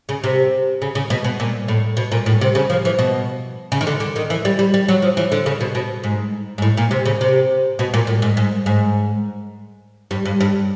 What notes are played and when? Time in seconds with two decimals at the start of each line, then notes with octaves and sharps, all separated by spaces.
0.09 C#3
0.24 C3
0.82 C#3
0.95 C#3
1.10 B2
1.24 B2
1.40 A#2
1.68 A2
1.97 B2
2.12 A#2
2.26 A2
2.41 C3
2.55 C#3
2.70 F3
2.85 E3
2.99 B2
3.72 C#3
3.81 D#3
3.87 D3
4.00 D3
4.16 D#3
4.30 E3
4.45 G3
4.59 G3
4.74 G3
4.88 F#3
5.02 F3
5.17 E3
5.32 D3
5.46 C#3
5.61 B2
5.75 B2
6.04 G#2
6.58 G#2
6.62 A2
6.77 A#2
6.91 C3
7.05 C#3
7.21 C3
7.79 B2
7.94 A#2
8.07 A2
8.22 G#2
8.37 G#2
8.66 G#2
10.11 G2
10.25 G2
10.41 G2